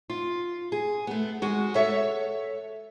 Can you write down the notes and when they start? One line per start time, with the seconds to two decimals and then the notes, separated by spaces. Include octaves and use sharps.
0.10 F4
0.72 G#4
1.07 A3 B3
1.42 G#3 F#4
1.75 A4 C#5 E5